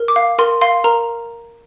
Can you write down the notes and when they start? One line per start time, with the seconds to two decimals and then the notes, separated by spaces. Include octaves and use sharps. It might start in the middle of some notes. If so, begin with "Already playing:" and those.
Already playing: A#4
0.08 D6
0.16 F5
0.39 A#4 C6
0.61 F5 C6
0.84 A#4 A#5